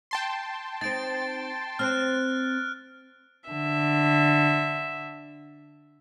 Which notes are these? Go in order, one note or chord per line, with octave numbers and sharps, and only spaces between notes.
G5 A5 C6
C4 D#4 A6 D7
C4 C5 F6 F#6
D3 E5